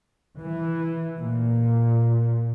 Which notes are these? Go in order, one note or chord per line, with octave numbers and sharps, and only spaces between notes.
E3
A#2